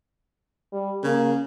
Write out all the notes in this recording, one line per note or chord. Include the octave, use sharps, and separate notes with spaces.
G3
C#3 A#3